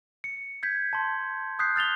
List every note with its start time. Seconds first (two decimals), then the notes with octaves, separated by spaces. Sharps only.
0.24 C#7
0.63 G6 G#6 B6
0.93 A5 C6
1.59 D#6 F#6 G6 B6 C7
1.76 F6 A6 F7 G7